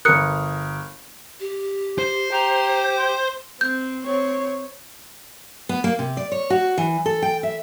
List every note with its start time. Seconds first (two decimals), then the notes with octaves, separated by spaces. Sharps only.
0.05 G1 A#4 D#6 F#6 C#7
1.40 G4
1.98 C5
2.32 G4 A#5
2.97 C6
3.61 C4 G6
4.05 C4 C#5
5.69 B3
5.84 A#3
5.99 C3
6.17 D5
6.32 C#5
6.50 F#4
6.78 E3
7.06 A4
7.22 G5
7.43 E5